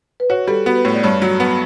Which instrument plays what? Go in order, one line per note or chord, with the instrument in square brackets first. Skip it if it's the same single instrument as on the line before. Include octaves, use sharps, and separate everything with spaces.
[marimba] B4
[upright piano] F#4 [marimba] C#5
[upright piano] G3 [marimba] A4
[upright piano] B3 [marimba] F#4
[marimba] B4
[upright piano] A2 [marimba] C#5
[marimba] D5
[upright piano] G2 [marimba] C#5
[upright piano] F#3
B3